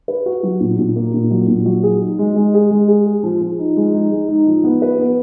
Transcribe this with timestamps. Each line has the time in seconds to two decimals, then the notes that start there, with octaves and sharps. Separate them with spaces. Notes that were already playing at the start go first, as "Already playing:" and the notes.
0.08 B4
0.26 F#4
0.43 F#3
0.60 A#2
0.78 A#2
0.96 A#3
1.14 A#2
1.31 F#3
1.48 A#2
1.66 F#3
1.83 G#4
2.01 D#4
2.19 G#3
2.36 G#3
2.54 G#4
2.71 G#3
2.88 G#4
3.06 G#4
3.23 F3
3.41 F3
3.59 D#4
3.77 G#3
3.94 D#4
4.11 G#3
4.28 D#4
4.46 F3
4.64 B3
4.82 B4
4.99 B3